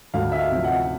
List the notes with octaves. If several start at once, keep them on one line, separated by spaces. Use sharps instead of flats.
D2 F5
E5
F5
C3 F3
F#5